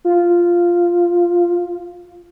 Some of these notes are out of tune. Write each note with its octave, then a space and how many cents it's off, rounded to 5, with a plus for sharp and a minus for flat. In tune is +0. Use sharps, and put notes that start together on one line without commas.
F4 -5